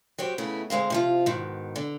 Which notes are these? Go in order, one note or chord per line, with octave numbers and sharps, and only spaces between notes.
F#3 C4 G4
C#3 A3 B3 E4
D2 G#3 C4 F5
C3 F3 F4
G#2 B2 D#3
D3